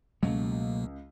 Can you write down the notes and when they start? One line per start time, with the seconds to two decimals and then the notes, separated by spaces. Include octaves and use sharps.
0.23 C#2 B2 F#3 A3 A#3